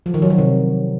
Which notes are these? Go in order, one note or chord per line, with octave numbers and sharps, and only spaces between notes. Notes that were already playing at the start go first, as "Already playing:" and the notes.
F3
D#3
F#3
D#3
C3